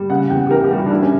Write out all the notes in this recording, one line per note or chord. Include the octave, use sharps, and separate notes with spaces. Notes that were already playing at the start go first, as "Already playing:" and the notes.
Already playing: G3
C#3 F#5
E2 G5
G4
E3 A#4
G4
G3
F#4
D4
D3 E4
C#4